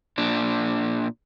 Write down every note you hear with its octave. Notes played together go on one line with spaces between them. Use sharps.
A#2 D4